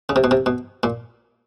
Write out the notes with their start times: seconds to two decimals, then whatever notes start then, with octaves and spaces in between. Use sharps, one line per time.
0.09 C#3
0.16 C3
0.24 B2
0.31 C3
0.46 B2
0.83 A#2